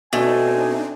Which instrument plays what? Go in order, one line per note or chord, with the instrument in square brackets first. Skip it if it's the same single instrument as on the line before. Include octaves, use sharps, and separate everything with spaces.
[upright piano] B2 [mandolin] A3 [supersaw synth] C4 D4 D#4 [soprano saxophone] G#5